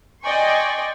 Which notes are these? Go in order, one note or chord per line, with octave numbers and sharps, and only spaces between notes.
D5 D#5 G5 G#5 C6 C#6